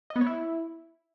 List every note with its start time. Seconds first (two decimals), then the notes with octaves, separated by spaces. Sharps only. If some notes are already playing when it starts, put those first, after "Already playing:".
0.10 D#5
0.16 B3
0.21 C#5
0.26 E4